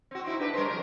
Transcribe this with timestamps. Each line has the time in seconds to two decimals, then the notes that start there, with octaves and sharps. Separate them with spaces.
0.11 C4 F#4
0.24 C4 D#4 E4
0.40 D4 G4 B4
0.53 G3 A#4 C5
0.68 F2 F#3 A#4